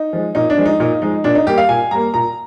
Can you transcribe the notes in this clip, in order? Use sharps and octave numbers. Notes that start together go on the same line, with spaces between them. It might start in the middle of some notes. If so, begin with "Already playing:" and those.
Already playing: D#4
F3 G#3
A#2 D#4
D4
F3 G#3
D#4
A#2 D#4
F3 G#3 D#4
A#2 D4
D#4
G3 A#3 G4
F5
A#2 G#5
G3 A#3 A#5
A#2 A#5